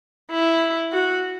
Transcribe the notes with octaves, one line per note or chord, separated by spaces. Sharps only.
E4
F#4